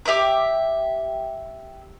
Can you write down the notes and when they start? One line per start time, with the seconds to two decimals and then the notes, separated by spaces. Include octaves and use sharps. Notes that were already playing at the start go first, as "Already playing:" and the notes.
0.06 G4 E5 G5 D6